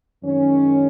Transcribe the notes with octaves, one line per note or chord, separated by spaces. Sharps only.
F#2 D#3 G#3 C#4